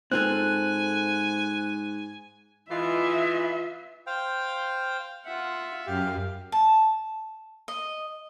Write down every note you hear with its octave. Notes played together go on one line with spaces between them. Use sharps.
G#2 C4 F4 A4 G#5 F#6
E3 G#3 F4 D#5 E5
C5 F5 G5
F4 E5 F#5
F#2 G4 F5
A5
D#5